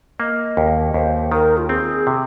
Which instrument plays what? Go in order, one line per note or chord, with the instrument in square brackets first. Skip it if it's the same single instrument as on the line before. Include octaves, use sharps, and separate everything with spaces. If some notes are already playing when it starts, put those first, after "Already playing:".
[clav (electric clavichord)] A#3 [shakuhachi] D#5
[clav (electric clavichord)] D#2
[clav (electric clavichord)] D#2 [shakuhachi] C5
[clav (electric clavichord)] D#3 [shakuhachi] A#4
[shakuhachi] F4
[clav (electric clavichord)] C4 [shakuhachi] G#4
[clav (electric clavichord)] C3